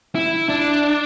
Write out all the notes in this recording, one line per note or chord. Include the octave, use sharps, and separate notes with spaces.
E4
D4